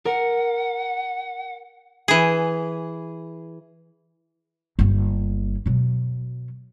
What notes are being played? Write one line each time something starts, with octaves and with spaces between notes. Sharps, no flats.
A#4 F#5
E3 G#4
G1 A#3
B2 F#3